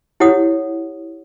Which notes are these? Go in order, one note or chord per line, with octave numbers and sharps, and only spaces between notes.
E4 G4 C#5 F#5 D#6